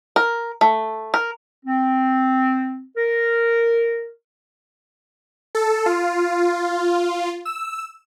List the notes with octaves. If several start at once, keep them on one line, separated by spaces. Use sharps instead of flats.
A#4
A3
A#4
C4
A#4
A4
F4
E6